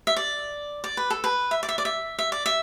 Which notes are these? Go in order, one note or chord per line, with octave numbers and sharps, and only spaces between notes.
E5
D5
D5
B4
A4
B4
E5
D5
E5
D5
E5
E5
D5
E5